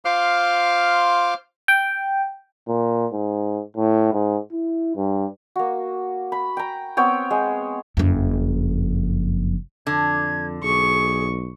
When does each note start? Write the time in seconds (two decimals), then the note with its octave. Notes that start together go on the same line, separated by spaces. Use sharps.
0.05 F4 C5 F5 C6 D6 F6
1.68 G5
2.68 A#2
3.12 G#2
3.77 A2
4.13 G#2
4.52 E4
4.96 G2
5.56 A#3 F#4
6.32 B5
6.57 G5 A#5
6.97 B3 C4 C#5 G5
7.31 G#3
7.97 F#1 F2
9.87 F2 D3 G#6
10.62 B1 G#4 C#6